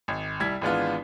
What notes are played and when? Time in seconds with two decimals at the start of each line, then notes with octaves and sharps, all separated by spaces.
0.08 G#1
0.40 C2 G3 E4 G#6 B6
0.61 G#1 E3 G#3 B3 D4 F4